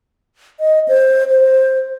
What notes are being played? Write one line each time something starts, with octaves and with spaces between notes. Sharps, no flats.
D#5
C5
C5